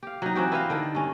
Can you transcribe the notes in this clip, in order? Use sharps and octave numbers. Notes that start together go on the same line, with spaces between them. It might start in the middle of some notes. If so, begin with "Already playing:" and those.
G4 F5
F#3 D#4
E3 C4 F#4 G4
E4 B4 D#5 F5
D3 D#3 A4
G2 C#4